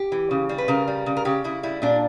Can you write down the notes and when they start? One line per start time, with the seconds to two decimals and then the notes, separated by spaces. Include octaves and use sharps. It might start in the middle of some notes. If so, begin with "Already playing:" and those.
Already playing: G4
0.12 E3
0.31 C#3
0.49 G3
0.58 B4
0.68 C#3 A#4
0.88 G3
1.06 C#3
1.17 A#4
1.25 C#3 G4
1.44 C#3 E4
1.63 G3 E4
1.82 A#2 D4